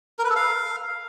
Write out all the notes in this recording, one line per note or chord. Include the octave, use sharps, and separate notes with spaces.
A#4
B4
A4
F5